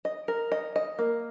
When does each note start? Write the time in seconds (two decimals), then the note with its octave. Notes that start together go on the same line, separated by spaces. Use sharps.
0.05 D#5
0.28 A#4
0.52 D#5
0.76 D#5
0.99 A#3